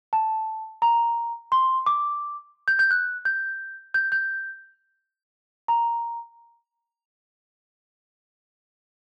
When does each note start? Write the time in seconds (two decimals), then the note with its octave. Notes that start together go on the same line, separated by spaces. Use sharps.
0.13 A5
0.82 A#5
1.52 C6
1.86 D6
2.68 G6
2.79 G6
2.91 F#6
3.25 G6
3.94 G6
4.12 G6
5.68 A#5